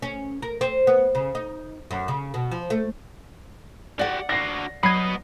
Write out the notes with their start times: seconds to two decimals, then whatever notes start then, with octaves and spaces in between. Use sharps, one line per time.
0.02 C#4
0.42 A#4
0.61 C4
0.87 B3
1.15 C#3
1.35 D#4
1.91 F#2
2.08 C#3
2.34 B2
2.51 F3
2.70 A3
3.99 F#4 G4 D5 F#5
4.29 D4 F#4 A#6 C7
4.83 F#3 B3 D#5 B5 G#6 C7